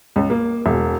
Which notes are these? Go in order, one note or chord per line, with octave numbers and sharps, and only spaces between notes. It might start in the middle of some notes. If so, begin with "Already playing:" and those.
C#2
A#3
E1